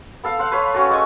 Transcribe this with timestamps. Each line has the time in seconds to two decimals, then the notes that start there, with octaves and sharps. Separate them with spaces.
0.23 B3 A4 F5
0.39 C5 F5 F#5
0.52 B4 C#5 F5
0.74 C#4 F#4 A4
0.90 G#3 C#6